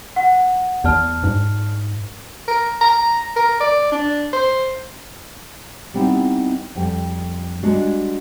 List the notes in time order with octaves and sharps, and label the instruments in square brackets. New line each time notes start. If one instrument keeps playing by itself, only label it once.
[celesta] F#5
[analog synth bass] E2 [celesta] D5 A5 F6
[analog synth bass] G#2
[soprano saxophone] A#4
A#5
A#4
D5
D4
C5
[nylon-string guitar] G3 B3 C4 D#4 E4 D#5
F2 G3 G5
G3 G#3 A#3 D4 F#4